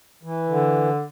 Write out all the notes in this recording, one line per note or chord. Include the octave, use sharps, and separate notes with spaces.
E3
D3